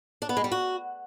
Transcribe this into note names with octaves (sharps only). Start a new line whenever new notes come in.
D4
B3
G#3
G3
F#4